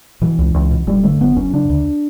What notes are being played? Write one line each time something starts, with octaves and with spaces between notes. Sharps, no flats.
B2 E3
C#2
C#2
B2
F#1 G3
D3 A3
F#1 B3
F#2 C#4
C#3 D4
D2